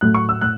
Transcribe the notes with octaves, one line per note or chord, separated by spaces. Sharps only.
A2 F#3 A3 F#6
C#6
E6
A2 F#6